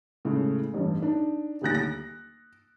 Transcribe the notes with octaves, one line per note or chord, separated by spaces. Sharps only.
A2 C#3 G#3
A1 G2
D4 D#4
D#1 D2 F#6 A#6
A#6